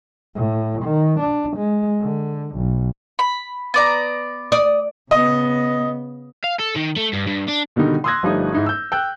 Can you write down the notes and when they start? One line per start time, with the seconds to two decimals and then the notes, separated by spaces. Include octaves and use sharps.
0.35 A2
0.82 D#3
1.20 D4
1.56 G#3
2.02 D3
2.55 B1
3.19 B5
3.74 B3 D5 A#5
4.52 D5 D#6
5.11 C#3 B3 D#5
6.44 F5
6.60 A4
6.76 D#3
6.97 A3
7.14 G2
7.27 G2
7.49 D4
7.76 B2 D3 D#3 G3 D#4
8.04 C6 D#6 E6 F#6 G#6 A#6
8.23 G1 F3 G3 A3 D#4 D#6
8.53 G#2 D#4 E4
8.66 E6 G6
8.92 G5 E6 F#6 G6